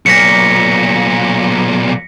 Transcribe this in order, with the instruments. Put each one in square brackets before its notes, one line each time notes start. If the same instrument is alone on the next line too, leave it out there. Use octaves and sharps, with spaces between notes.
[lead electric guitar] B1 A#2 [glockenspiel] A#6 B6 C#7